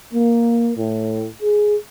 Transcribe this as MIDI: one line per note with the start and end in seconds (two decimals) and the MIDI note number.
0.14 0.72 58
0.77 1.26 45
1.42 1.76 68